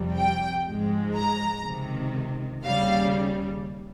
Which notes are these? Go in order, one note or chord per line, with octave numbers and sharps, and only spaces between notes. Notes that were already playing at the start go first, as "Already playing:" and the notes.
Already playing: F2 C3 G3
G5
G#2 F3 G#3
A#5
C#2 C3 D#3
D#2 C#3 G3 F5